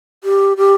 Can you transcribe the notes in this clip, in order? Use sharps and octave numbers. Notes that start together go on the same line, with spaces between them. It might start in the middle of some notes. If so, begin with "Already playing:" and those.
G4
G4